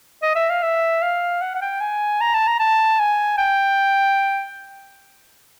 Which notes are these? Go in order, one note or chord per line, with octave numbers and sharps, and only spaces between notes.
D#5
E5
F5
E5
F5
F#5
F#5
G5
G#5
A#5
A5
A#5
A5
G#5
G5